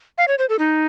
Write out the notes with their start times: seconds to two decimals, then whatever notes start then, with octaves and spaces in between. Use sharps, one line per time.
0.18 F5
0.28 C#5
0.38 C5
0.49 A4
0.59 D#4